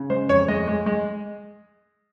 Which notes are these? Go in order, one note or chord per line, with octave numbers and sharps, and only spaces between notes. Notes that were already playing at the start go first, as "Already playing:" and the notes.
Already playing: C#3
G#3 C5
F2 C#5
G#3 D#5
G#3
G#3